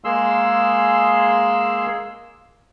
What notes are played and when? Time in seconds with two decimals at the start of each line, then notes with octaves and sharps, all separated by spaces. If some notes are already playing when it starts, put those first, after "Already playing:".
0.04 G#3 A#3 G#4 C6 E6